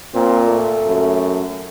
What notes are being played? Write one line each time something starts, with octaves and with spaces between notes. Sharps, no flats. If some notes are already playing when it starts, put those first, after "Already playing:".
A#2 C4
A3
F#2